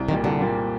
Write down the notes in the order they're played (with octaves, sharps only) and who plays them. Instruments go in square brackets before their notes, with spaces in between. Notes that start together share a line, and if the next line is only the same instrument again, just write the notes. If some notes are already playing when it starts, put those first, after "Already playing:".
Already playing: [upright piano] C2
[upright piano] A#2 G3 A#3 [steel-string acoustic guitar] D#3
[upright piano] C2 [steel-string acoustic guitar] D3
[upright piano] A#2 G3 A#3